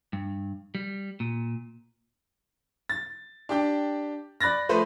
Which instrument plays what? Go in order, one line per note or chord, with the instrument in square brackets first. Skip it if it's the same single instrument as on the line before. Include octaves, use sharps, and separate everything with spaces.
[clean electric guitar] G2
G3
A#2
[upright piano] A6
D4 G4 G5
D5 B5 F#6 A6 A#6
F3 A3 B4 C5